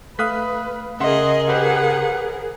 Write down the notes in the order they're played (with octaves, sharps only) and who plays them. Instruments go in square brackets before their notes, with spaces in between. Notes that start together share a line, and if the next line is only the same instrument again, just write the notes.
[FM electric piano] A3 F5 [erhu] B4 [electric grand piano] D#6 F#6 B6
[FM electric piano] C#3 [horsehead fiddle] G#4 A#4 [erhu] D#5 [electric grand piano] E5 F#5 C6
[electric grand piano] G4 B4 C5 [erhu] F#5